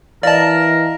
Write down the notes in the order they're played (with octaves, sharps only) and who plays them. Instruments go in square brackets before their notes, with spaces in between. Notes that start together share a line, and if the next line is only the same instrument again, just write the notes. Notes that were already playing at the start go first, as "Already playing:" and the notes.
[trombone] E3 [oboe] A#4 [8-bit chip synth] D5 A5 [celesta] D#5 F5